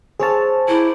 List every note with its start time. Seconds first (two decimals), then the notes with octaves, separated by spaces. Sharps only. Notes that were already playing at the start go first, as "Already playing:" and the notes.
0.19 C4 G#4 C#5 F5 A5
0.68 E4 A#4 D6 G6